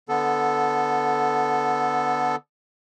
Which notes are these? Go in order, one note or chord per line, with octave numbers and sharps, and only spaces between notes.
D3 B3 A4